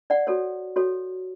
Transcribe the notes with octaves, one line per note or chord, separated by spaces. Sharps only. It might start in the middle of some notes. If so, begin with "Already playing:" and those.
D5 F#5
F#4 A4 C#5
F#4 A4 C#5